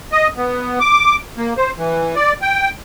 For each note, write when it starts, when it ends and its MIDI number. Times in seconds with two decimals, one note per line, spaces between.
0.12 0.28 75
0.37 0.79 59
0.80 1.16 86
1.37 1.54 58
1.57 1.71 72
1.78 2.15 52
2.16 2.33 74
2.42 2.70 79